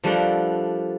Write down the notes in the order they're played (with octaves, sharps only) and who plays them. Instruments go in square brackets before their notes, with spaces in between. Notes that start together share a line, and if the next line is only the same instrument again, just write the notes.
[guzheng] F3 G3 A3 D4 A#4 F#5